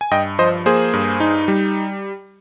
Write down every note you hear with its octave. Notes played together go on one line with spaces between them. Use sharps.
G#5
G2 D#5 G5
F3 C5 D#5
A#3 G#4 C5
G2
D#4
G3